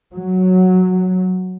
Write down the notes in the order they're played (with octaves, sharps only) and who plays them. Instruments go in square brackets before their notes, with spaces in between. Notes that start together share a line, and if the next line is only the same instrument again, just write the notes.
[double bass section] F#3